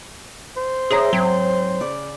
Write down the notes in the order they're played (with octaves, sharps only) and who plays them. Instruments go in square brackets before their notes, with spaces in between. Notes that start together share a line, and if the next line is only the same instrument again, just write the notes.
[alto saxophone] C5
[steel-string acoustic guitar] E4 C#5 A#5 [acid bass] G#4
[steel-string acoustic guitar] G#2 C4 [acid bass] F#3
[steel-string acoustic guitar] C#3 D5